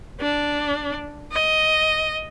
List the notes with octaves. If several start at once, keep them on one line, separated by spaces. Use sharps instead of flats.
D4
D#5